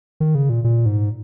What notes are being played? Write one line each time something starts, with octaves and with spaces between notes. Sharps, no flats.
D#3
C#3
A#2
A#2
G#2